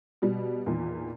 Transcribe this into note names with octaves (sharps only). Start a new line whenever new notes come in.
B2 G3
E2 A#2 D#3